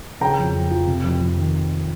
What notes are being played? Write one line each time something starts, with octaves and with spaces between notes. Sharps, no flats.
C#3 G5 A#5
F2
F2
F3
C3
F2
F2
D#3